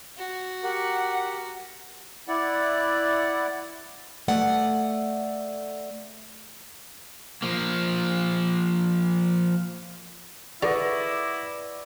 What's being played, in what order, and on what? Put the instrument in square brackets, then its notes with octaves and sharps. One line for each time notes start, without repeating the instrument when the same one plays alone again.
[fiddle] F#4
[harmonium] G4 A#4 [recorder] F#5
[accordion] E4 D5 F#5
[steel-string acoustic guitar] A3 D5 F#5
[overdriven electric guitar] F3 A#3
[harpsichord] D3 [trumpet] E4 [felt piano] G#4 B4 F#5 [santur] D5 D#5 C#6